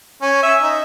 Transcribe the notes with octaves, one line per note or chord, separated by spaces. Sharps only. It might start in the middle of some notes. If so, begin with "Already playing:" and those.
C#4
E5
D#4